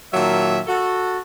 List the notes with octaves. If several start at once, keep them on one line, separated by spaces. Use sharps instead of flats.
A#2 D#3 F#3 A#3 E5 A5
F#4 A4